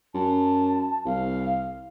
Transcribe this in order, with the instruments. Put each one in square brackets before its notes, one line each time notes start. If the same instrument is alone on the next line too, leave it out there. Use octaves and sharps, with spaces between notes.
[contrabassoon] F#2 [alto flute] A5
[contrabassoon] C2 [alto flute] F5